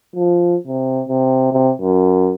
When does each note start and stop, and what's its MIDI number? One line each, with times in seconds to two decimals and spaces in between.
0.16 0.56 53
0.67 1.03 48
1.09 1.48 48
1.52 1.72 48
1.82 2.33 42